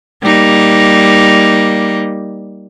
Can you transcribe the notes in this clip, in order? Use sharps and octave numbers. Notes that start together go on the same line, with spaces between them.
G3 A#3 D#4